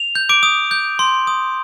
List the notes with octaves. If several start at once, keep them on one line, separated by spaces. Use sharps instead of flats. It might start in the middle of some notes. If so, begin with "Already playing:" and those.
Already playing: F7
G6
D6 D7
D#6
G6
C6
D#6